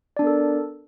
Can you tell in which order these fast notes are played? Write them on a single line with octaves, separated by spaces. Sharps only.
D5 D4 B3 A#4 A4